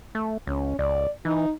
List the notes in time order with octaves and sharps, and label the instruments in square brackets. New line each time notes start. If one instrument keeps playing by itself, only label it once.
[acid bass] A3
[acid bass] C#2 [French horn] C#4
[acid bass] C#2 [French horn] D5
[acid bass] E3 [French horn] D#4